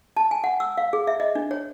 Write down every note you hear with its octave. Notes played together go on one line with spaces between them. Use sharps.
A5
G#5
F#5
E6
F5
G#4
E5
D#5
D4
C#5